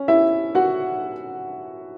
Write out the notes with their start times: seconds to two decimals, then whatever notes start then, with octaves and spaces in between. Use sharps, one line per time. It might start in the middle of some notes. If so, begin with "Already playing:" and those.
Already playing: C#4
0.08 E4 E5
0.55 F#4 F#5